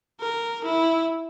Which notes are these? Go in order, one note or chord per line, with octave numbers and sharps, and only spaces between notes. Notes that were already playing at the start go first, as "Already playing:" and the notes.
A#4
E4